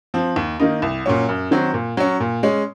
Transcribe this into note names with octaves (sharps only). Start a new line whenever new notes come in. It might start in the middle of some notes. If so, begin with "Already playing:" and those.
F3 C4
D#2
D#3 A#3 D#4
C2
A#2 F#3 C#4
F#2
D#3 F#3 C4
A#2
F#3 C#4
A#2
G#3 C#4